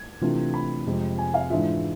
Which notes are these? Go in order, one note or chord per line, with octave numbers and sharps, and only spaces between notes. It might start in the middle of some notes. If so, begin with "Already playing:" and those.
Already playing: G#6
C3 E3 A3 D4 F4
B5
F2 C3 G#3 C4
G#5
F5
G#2 E3 G#3 D4 F4 E5